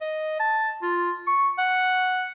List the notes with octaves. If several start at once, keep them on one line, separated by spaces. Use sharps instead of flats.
D#5
A5
F4
C#6
F#5